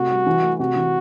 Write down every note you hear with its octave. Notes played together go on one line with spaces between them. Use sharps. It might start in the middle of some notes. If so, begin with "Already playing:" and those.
Already playing: C3 A3 F#4
G3
E3
A3
C3 F#4
E3